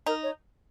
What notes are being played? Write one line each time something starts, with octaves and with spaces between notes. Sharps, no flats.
D#4 A#4
C#5